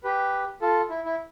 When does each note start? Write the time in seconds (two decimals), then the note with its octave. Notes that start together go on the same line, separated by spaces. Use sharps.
0.04 G4 B4
0.62 F4 A4
0.90 E4
1.05 E4